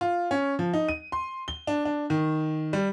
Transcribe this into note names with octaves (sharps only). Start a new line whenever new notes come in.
F4
C#4
F3
D#4
D#7
C6
G7
D4
D4
D#3
G3